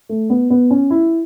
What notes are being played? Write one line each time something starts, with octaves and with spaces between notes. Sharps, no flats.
A3
B3
B3
C#4
E4